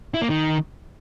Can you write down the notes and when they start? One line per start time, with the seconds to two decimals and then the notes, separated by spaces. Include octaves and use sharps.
0.14 E4
0.22 A#3
0.29 D#3